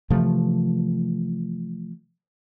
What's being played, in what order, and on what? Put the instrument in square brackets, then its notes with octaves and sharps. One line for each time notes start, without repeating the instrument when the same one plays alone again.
[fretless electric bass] C3 E3 F3 A3